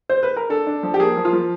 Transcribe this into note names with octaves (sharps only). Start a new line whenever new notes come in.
C5
B4
A#4
D4 A4
D4
F3
G4
A#3 G#4
F3
F4
F3